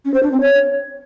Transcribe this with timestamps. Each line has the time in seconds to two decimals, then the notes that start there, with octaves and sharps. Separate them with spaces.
0.05 C#4
0.14 C5
0.23 D4
0.32 C4
0.41 C#5